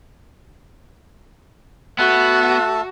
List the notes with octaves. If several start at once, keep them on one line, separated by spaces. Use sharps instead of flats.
A3 B3 F#4 E5 A5 F#6